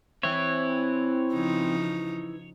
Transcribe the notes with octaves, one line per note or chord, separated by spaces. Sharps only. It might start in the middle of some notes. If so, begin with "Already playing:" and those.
E3 C4 E4 C#5
C#3 F3 D#4